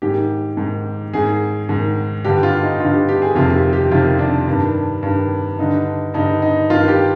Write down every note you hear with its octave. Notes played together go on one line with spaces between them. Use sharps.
G#2 D#3 G4
G#2 D#3
G#2 D#3 G#4
G#2 D#3
G2 D3 G4
F4
D#4
G2 D3 F4
G4
G4
G#4
F2 C3 D#3 F4
G4
G4
F2 C3 D#3 F4
D4
G2 D#3
G2 D#3
G2 D3 D#4
G2 D3 D#4
D#4
G2 D#3 F4
G4